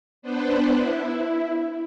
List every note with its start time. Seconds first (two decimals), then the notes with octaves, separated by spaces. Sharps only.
0.22 B3 D4 B4 C5
0.76 E4